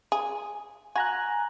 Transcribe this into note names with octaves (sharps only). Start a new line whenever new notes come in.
G#4
F#4 G#5 A#5 F#6